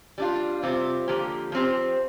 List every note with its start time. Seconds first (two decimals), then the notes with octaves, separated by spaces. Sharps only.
0.18 G3 D4 F4
0.63 C3 G3 C4 F4
1.08 D3 F3 A#3 G4
1.52 F3 C4 G4